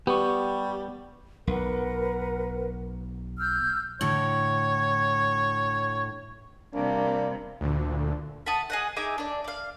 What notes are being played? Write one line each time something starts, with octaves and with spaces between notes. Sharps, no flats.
G3 B3 G4 C#6
B1 A#4 B4 F#5
E6 F6 G6
A2 D3 C#5
C3 G3 A#3 D4
D2 A#2 D3
E5 F#5 A5 D#6
G#4 D#5 F#5
D#4 G#4 E5 D6
D4 D5
D5 F5